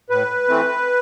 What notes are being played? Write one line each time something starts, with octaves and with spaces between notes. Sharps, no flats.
A2 B4
E3 A3 C4